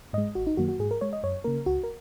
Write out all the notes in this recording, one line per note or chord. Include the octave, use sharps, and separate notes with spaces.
G#2 G#3 D#5
G#1 F#4
D#4
F#2 D#3 F#3 A#3 F#4
F#4
G#2 G#4
A#4
G#3 C#5
D#5
F#2 C#5
C#3 A#3 A#4
C#2 F#4
A#4